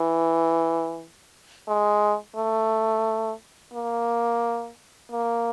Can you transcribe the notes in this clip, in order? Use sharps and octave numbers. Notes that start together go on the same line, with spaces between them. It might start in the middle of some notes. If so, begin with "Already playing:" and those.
Already playing: E3
G#3
A3
A#3
A#3